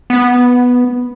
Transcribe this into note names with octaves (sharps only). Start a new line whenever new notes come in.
B3